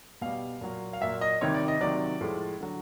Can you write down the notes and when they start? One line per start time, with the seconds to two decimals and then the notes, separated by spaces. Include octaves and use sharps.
0.22 B2 G3 F5
0.61 A#2 F#3
0.93 F5
1.01 A#2 F#3 E5
1.21 D#5
1.41 C3 D#3 G3 C#5
1.54 D5
1.68 D#5
1.81 C3 D#3 F#3 D5
2.21 A2 F3 G#3
2.61 D3 F#3